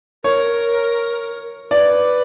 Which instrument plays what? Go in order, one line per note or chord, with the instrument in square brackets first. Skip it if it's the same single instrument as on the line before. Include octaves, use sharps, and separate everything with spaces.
[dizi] A#4 [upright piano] C#5
[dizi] B4 [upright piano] D5